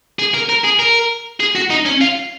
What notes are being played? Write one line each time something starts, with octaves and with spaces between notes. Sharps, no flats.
G#4
A#4
A#4
G#4
A#4
G#4
F#4
D#4
C#4
F4